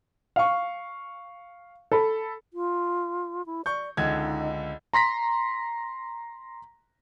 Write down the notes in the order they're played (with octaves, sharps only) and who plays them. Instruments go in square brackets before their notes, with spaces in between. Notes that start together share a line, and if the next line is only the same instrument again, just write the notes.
[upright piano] F5 C#6
A4 B5
[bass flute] F4
E4
[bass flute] D5 [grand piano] C#6 G6
[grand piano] C#2 D3 G#6 [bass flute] D#4
[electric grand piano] A#5 C6 A#6 B6